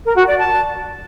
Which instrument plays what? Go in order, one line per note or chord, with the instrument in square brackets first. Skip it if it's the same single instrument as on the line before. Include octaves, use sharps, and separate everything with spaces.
[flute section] A#4
F#4
D5
A5